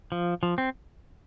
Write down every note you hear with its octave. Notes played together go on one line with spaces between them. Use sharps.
F3
F3
C4